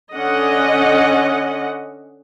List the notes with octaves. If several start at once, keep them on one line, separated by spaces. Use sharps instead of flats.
D3 C#4 D#5 F#5